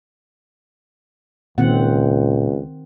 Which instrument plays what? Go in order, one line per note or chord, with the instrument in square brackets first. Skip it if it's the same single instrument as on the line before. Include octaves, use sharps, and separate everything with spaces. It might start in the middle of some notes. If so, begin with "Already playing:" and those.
[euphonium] C#2 [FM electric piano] A#2 [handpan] D#3 C4 F#5